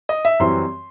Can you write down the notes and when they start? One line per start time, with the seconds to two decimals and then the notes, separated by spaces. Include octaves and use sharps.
0.09 D#5
0.25 E5
0.40 F#2 E3 G3 C4 C6